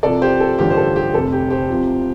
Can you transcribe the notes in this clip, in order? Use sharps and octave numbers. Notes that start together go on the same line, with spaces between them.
C2 C3 F3 A4 D5
G4 C5
A4
A1 G2 D3 F3 G4
C5
A4
G4
F1 F2 C3 A4
G4
G4 C5
C2 C3 F3